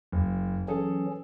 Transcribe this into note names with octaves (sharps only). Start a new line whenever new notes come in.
F#1
E3 F#3 C#4 G#4 A4